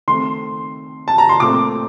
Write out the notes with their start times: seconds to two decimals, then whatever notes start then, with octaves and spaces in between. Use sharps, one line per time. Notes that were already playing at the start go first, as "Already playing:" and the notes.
0.08 D#3 A3 C4 C6
1.08 A5
1.18 A#5
1.29 C6
1.40 A#2 A3 C4 D6